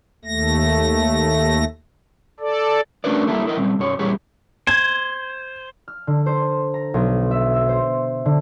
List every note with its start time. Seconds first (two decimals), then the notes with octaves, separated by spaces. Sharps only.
0.25 D#2 A3 A#6
2.40 A4 D5
3.04 A3 C#4 D4 A#4 B4 D5
3.27 G3 A#3 E4 A4
3.45 E4 A#4 D#5
3.57 A#2 G3 C4
3.79 B1 F#2 C#5
3.99 E2 A#2 G3 G4 G#4 C#5
4.67 C5 G#6
5.88 F6
6.07 D3
6.26 C5
6.74 A#5
6.94 B1
7.31 E5
7.53 E6
7.69 C5
8.25 D3